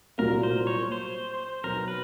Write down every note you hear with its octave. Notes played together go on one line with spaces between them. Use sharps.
C2 A#2 F#3 A#3 A#4
C5
C#5
C5
B1 B2 F#3 B3 A#4
B4